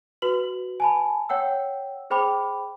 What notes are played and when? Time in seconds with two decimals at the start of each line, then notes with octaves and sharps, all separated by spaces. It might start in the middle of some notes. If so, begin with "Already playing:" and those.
0.22 F#4 B4 F#7
0.80 G#5 A5 B5
1.29 C#5 F#5 G5 E6
2.10 G#4 C5 G5 B5 D6